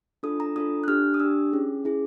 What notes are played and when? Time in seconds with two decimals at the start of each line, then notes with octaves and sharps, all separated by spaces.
0.23 D4 F4 A4 D#6
0.40 A#5
0.56 D4 F4 A4 D#6
0.84 F#6
0.88 D4 G4 F6
1.14 D#6
1.20 D4 G4 E6
1.52 C#4 E4 G#4
1.84 C#4 E4 G#4